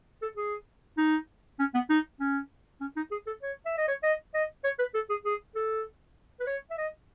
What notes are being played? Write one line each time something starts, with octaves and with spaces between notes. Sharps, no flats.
A4
G#4
D#4
C#4
B3
D#4
C#4
C#4
D#4
G#4
A4
C#5
E5
D#5
C#5
D#5
D#5
C#5
B4
A4
G#4
G#4
A4
B4
C#5
E5
D#5